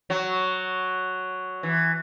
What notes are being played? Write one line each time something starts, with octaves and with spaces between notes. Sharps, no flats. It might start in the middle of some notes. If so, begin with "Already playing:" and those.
F#3
E3